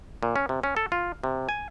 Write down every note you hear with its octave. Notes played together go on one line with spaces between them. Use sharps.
A#2
C#4
C3
C#4
A4
F4
C3
G#5